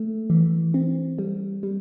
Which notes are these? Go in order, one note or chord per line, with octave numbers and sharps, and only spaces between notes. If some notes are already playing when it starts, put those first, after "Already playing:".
Already playing: A3
E3
C4
G3
G3